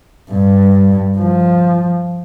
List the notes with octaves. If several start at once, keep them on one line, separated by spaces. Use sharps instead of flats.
G2
F3